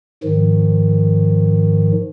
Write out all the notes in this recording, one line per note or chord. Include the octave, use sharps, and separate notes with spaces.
G#2 D#3 F3